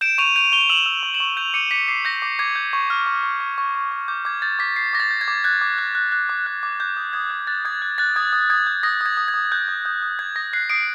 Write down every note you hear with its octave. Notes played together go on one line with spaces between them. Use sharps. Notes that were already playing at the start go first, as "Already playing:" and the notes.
G6 D7 E7
C#6 D#7 F7
G6 D#7 F7
C#6 F7 G7
E6 E7 F#7
E6
C#6
E7 F#7
C#6
G6 D#7 F7
D6 C#7 D#7
D6 B6 C#7
D6 C7
G6 A#6
D6
D6 G#6
G6
C#6
F6
C#6
C#6
C#6
C#6
C#6
C#6
D6 G6
D6 G#6
G6 A6
D6 B6
G6 C7
D6 A#6
A6
G6
G#6
D6
F#6 G#6
D6
F#6
F#6
F#6
D6
F#6
D6
F#6 G6
D#6
D#6 G#6
F#6
F#6 A6
D#6 G#6
F#6
F#6 A6
D#6 G#6
D#6
D#6 G#6
G6
D#6 A#6
D#6 G#6
D#6
G#6
D#6
F#6 G6
D#6
D#6 G6
D#6
F#6 G#6
D#6 A#6
F#6 C7
D#6 C7 D7